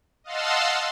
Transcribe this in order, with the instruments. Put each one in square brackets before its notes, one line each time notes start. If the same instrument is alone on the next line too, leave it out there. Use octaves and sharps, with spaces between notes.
[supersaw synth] D#5 F5 F#5 A5 C6 E6